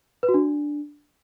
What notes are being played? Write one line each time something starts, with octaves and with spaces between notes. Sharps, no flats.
B4
F#4
D4